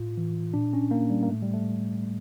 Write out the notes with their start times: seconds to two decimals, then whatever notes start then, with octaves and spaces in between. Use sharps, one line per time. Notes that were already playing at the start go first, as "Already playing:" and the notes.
Already playing: A2 F4
0.17 E3
0.54 A#2 D4
0.73 C#4
0.91 A#3
1.10 G3
1.23 A#3
1.29 A2 A3
1.42 G3
1.53 A3